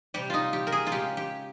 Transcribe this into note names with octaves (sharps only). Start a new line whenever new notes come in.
C3 G3 G4
D#4 F4
G4
A#4
G#4
F4
C#3 G#3 G4
G4